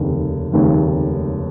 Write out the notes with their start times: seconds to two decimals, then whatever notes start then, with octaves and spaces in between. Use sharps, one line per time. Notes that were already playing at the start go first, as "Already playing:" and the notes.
Already playing: F1 D#2 C#3
0.52 F1 D#2 C#3